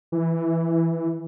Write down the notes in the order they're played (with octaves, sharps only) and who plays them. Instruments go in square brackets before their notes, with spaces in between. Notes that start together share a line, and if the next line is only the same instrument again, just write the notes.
[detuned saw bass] E3